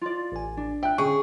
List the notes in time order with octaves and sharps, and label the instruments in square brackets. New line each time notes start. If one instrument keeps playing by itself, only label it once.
[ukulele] F4 D5
[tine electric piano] A1 G#5
[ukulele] D4
[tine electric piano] E5 F#6 [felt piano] G5
[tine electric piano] D3 C#4 [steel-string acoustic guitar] G#4 [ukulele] G5 [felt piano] C#6